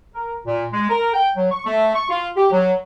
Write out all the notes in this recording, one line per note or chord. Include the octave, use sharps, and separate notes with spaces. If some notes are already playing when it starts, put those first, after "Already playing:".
A#4
A#2
G#3
A#4
G5
F#3
C#6
A3
C#6
F4
G4
F#3